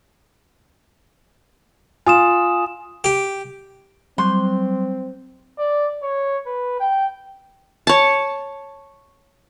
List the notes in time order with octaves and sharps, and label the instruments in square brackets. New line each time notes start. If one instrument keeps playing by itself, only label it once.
[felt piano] F4 [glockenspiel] G#5 D#6 E7
[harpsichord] G4
[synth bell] F#3 G3 [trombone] C4 [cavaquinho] C6
[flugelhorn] D5
C#5
B4
G5
[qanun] C#5 A5